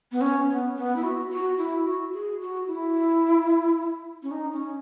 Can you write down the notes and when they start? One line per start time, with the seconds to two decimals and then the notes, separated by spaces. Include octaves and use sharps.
0.12 B3
0.21 C#4
0.49 B3
0.76 B3
0.96 E4
1.04 F#4
1.31 F#4
1.58 E4
1.85 F#4
2.13 G#4
2.41 F#4
2.67 E4
4.23 C#4
4.31 D#4
4.52 C#4